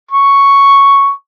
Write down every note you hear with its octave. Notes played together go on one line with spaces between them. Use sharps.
C#6